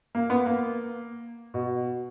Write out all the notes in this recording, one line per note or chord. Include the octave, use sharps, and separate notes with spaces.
A#3
B3
A#3
B2